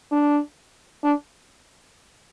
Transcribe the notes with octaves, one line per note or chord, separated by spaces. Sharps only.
D4
D4